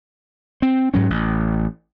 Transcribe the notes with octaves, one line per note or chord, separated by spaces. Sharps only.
C4
G#2 F#3 C#4
A1